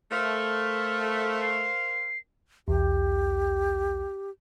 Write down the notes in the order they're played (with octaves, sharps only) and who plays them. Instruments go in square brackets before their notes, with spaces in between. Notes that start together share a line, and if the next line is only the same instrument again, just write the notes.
[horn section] A3 [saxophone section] A#4 C5 F5 [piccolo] F6
[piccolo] C7
[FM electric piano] B1 E2 [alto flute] G4